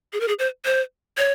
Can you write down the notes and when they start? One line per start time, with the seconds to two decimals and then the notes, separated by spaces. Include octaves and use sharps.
0.13 G#4
0.20 A#4
0.28 G#4
0.39 C5
0.65 C5
1.18 C#5